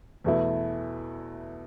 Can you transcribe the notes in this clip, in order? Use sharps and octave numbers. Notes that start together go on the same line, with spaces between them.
E2 B2 A3 E4